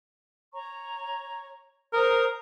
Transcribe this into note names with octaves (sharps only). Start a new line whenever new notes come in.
C#5 A#5 C#6
A#4 C5 A#5 D#6